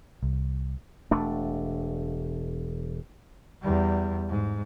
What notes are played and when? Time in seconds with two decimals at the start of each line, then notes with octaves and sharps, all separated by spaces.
0.23 C2
1.11 E1 A3 D4
3.62 E2 G3
4.29 G#2